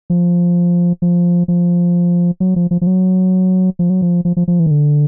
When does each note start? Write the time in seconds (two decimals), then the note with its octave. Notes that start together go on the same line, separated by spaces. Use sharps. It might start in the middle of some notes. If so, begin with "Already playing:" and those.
0.10 F3
1.02 F3
1.48 F3
2.40 F#3
2.56 F3
2.71 F3
2.82 F3
2.87 F#3
3.79 F3
3.90 F#3
4.02 F3
4.25 F3
4.37 F3
4.48 F3
4.60 E3
4.66 D#3
4.71 D3